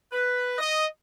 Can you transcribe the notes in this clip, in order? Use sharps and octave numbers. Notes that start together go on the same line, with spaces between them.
B4
D#5